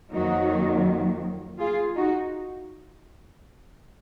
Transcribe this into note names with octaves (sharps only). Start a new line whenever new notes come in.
F2 D#3 F#3 A#3 D#4 F#4
F4 G#4
D#4 F#4